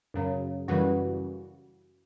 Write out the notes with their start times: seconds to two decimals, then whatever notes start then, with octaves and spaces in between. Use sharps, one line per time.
0.14 F#2 C#3 F#3
0.68 F#2 C#3 E3 G3 F#4